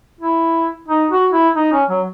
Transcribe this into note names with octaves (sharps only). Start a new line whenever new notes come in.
E4
D#4
F#4
E4
D#4
C#4
F#3